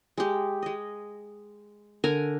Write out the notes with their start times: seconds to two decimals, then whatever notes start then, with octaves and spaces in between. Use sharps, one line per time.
0.17 G#3 G4
0.62 G#3 D#5
2.04 D3 A#4 G#5 A#5